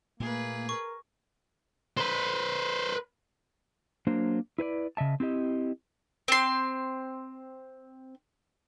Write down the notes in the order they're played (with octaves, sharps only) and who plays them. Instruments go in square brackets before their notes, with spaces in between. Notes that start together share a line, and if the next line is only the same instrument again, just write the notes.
[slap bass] A#2 A3 [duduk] A#3 [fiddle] G#4 B4
[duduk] A#4 [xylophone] C#6
[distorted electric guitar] B4 C5
[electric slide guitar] F#3 A#3 D4 C5
E4 B4 C5 D5
C#3 D#5 E5 A5
C4 E4 G4 D#5
[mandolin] C4 C6